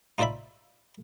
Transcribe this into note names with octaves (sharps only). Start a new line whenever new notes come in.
D#4 F4 C5 D5 E5 B5